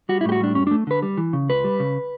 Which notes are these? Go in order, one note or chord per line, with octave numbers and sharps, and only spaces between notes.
G3 F#4
E4
A2 G4
F#4
G3 D4
F#2 C#4
D4
A3
D3 B4
G3
E3
C#3
C#2 B4
G3
C#3